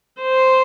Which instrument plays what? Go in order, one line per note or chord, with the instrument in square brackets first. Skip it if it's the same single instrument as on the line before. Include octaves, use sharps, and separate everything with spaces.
[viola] C5